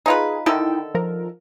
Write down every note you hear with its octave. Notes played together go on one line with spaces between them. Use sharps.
D#4 F4 G#4 B4
D3 D#3 D#4 E4 A4 G5
F3 A#4